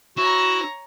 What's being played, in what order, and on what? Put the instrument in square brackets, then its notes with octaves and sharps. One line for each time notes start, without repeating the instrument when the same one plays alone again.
[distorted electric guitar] E4 [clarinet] F#4 [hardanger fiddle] C#5 A#5